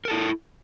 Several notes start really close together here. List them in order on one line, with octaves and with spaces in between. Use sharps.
A#4 A4 E4